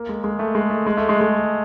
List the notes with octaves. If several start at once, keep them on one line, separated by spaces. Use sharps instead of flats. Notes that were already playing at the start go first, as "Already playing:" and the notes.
Already playing: A#3
G#3
G#3
A3
G#3
A3
G#3
A3
G#3
G#3